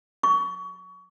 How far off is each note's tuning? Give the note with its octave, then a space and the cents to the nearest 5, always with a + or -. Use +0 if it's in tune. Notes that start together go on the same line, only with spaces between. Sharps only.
C#6 +25